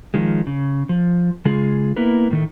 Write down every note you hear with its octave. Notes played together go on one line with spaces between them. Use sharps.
D#3 F3 G#3
C#3
F3
C#3 G#3 F4 G#4
A#3 B3 E4 A#4 B4
A2 D#3 A3